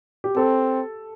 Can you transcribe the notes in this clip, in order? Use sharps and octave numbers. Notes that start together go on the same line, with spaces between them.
G4
C4 A4